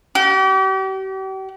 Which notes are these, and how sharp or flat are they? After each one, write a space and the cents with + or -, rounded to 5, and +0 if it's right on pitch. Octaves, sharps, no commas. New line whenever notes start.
G4 -40